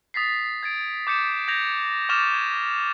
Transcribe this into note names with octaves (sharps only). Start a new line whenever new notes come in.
D#6 A6 B6 C7
G#6 A6 D7
D6 G6 A6 C#7 E7
G6 G#6 A#6 F7
C#6 D6 F6 A6 E7 F7
G#6